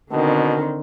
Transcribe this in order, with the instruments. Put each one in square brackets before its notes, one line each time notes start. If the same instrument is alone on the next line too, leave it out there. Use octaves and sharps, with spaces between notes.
[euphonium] B2 [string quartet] D3 D#3 C4